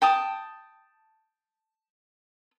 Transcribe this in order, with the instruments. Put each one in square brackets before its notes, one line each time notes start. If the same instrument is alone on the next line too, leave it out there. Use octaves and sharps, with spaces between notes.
[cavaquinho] G5 A5 D#6